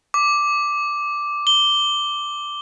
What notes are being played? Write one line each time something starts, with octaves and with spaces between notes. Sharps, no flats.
D6
G7